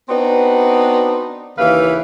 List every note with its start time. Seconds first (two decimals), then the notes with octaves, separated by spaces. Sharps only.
0.09 B3 C4 D4 D#4 F#4 B4
1.58 D#2 C#3 E3 B4 F5